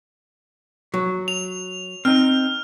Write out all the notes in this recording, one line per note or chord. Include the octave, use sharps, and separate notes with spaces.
F#3
F7
C4 D#4 F6